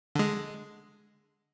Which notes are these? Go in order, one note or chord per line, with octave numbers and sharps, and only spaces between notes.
D3 G#3